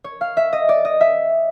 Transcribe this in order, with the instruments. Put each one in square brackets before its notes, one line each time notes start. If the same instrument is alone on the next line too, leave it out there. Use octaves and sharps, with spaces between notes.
[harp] C#5
F5
E5
D#5
D5
D#5
E5